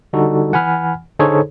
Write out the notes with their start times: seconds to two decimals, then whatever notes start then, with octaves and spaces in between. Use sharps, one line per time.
0.13 D3 G3 D#4 F#4 A4
0.52 E3 F#5 G#5 B5 F6
1.19 D3 D#4 G#4 A4 C5 C#5